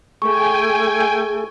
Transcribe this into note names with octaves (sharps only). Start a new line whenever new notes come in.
A3 G#4 A4 G5 G#5 C#6